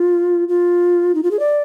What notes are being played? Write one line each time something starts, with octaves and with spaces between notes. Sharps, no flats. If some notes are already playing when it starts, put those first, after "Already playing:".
Already playing: F4
F4
D#4
F4
G#4
D5